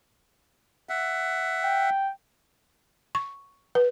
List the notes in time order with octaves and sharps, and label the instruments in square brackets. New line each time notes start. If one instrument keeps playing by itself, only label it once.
[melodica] E5 F#5
[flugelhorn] G5
[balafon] C#6
B4